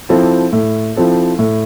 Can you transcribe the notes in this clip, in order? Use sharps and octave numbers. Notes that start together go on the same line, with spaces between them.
F3 C4 E4 A4
A2
F3 C4 E4 A4
A2